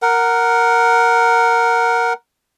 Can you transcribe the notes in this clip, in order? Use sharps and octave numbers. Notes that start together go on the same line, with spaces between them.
A#4 F#5